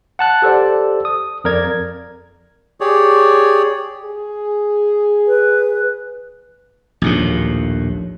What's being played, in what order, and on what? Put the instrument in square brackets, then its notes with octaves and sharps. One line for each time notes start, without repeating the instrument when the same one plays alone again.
[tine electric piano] F#5 A5 F#6
G4 A4 C5 D5
D#6
F2 A#4 D5 G#6
[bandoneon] G4 G#4 C#5 D5
[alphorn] G#4
[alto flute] B4
[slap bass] A#1 D#2 A2